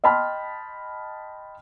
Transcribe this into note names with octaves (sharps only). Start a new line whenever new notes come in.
D#5 G5 A5 B5 C6 F6